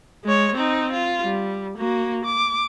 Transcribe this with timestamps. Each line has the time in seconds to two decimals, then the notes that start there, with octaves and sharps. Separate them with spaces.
0.25 G#3 C#5
0.56 C4 D#4
0.92 F4
1.23 G3
1.78 A#3 F#4
2.25 D6